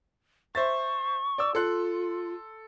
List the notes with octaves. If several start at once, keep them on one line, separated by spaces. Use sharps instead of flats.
C5 E5 C#6 A6
D5 D6 E6
F4 A4 C6 F#6